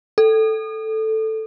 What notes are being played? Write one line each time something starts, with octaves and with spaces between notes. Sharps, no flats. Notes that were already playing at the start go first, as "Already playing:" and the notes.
A4